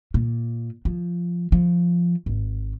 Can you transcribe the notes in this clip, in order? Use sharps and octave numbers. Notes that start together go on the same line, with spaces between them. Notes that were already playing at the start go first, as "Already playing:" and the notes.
A#2
F3
F3
G#1